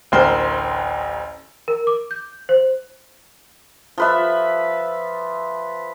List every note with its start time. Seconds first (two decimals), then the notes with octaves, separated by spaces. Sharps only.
0.12 A1 D2 A#4 C5 C6 F6
1.68 A#4
1.87 D6
2.11 G6
2.49 C5
3.98 F3 B4 E5